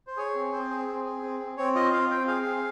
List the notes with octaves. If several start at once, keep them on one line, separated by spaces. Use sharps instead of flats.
C5
G#4 C#5
C4
C4 C5
G#4
C4
G#4
C4
C4
C4 C#5
F4 D#5
C4 F5
C4 G5
G#4 F5
C4